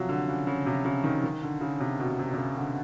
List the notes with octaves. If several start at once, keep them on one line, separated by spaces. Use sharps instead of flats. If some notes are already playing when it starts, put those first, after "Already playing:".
Already playing: C3 F3 F#3
D3
C#3
C#3
C3
C#3
D#3
D#3
D3
C#3
C3
B2
C3
C3
C#3
D3